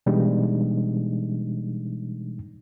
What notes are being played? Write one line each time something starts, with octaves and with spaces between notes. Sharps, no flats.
B2 E3 G3 G#3 D4 D#4